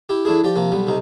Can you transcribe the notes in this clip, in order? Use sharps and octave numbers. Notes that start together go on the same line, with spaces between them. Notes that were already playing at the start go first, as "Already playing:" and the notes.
E4 G4
E3 A3 D4 E4 G#4
F3 G4 D5
C3 F3 A#3
B1 G3 B3
B1 C3 D#4